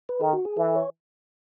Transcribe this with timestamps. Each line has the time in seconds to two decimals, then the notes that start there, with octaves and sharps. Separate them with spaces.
0.09 B4
0.21 D#3 A4
0.33 F#4
0.45 G#4
0.57 E3 A4
0.75 C#5